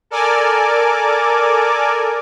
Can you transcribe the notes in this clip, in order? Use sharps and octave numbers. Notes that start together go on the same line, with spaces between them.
A4 A#4 D5 G#5 D6